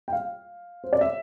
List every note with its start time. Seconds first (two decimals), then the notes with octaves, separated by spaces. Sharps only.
0.08 G5
0.13 F5
0.84 C5
0.93 D5
1.01 E5